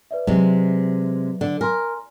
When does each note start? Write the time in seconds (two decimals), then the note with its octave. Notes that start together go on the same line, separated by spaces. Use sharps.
0.11 B4 D5 E5
0.27 C3 F#3 G#3
1.41 D3
1.61 A#4 G#5 A#5 C6